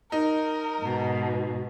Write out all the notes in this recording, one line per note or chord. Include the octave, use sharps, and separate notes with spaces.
D#4 A#4
G#2 B2